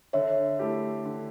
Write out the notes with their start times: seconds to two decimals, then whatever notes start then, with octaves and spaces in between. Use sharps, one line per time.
0.13 D3 C#5 E5
0.59 A3 E4 G4
1.05 D3